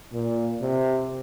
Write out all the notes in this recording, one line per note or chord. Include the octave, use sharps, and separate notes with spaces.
A#2
C3